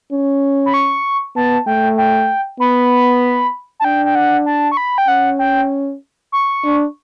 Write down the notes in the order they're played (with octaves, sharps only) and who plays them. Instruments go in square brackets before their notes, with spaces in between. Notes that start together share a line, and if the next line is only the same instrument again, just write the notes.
[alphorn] C#4
[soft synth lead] B5
C#6
[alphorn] B3 [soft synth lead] A5
[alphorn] A3 [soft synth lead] G5
[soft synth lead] G5
[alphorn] B3 [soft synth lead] B5
[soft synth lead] A5
[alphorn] D4 [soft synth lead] G5
[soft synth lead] G5
F#5
A5
C#6
B5
G5
[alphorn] C#4 [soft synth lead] F#5
[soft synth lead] G5
C#6
[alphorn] D4